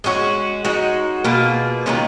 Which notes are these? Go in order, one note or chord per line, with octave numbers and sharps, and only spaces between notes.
G#3 C#4 F#4
G#3 D#4 F#4
B2 A#3 F4 G#4
D#3 G#3 C#4 F4